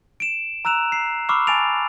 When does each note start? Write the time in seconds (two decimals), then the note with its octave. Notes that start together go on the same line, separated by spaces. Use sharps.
0.20 D7 E7
0.65 A#5 E6 F#6 E7 F7
0.92 C7
1.29 B5 C#6 D6 E6 F6 C7
1.47 G#5 A5 A6 D7 F7